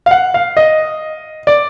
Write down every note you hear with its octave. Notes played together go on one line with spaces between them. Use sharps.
F5
F#5
F5
D#5
D5